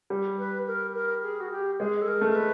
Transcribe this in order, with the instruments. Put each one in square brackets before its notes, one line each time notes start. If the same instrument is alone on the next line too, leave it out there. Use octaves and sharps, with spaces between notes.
[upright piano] G3
[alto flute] B4
A#4
A#4
G#4
F#4
G4
[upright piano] G#3 [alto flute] G#4
[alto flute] A4
A#4
[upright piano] A3
[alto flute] A#4
B4